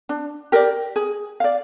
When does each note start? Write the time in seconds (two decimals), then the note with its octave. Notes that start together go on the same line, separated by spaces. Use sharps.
0.09 D4
0.52 G4 A#4 D5
0.96 G#4
1.40 D5 F5